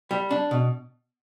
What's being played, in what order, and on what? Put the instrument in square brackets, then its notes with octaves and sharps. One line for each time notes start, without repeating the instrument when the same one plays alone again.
[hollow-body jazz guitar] G3
D4
B2